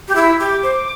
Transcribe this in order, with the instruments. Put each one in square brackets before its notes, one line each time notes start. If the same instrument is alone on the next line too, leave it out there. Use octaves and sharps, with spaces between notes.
[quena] G4
[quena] E4 [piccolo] E6
[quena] G4 [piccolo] D6
[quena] C5